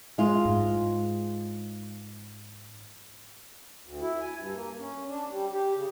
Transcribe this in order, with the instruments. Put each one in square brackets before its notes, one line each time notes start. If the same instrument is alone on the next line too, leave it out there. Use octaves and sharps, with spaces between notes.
[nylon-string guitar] G#3 F4
[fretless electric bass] G#2
[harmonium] D2
E4
G#5
G2
A#3
C#4
D4
G3
G4
C#3